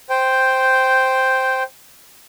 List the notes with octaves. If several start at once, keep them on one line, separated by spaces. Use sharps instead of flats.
C5 G5